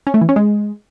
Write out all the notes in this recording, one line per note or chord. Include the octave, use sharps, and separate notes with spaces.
C#4
A3
E3
C#4
G#3